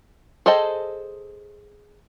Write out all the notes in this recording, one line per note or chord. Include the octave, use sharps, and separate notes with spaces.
G#4 A4 C5 D#5 A5